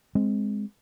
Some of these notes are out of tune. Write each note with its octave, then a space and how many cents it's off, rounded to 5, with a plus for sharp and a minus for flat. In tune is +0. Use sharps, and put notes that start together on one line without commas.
G#3 -5 C4 +0